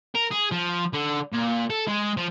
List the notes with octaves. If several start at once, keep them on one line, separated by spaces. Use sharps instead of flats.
A#4
G#4
F3
D3
A#2
A4
G#3
F3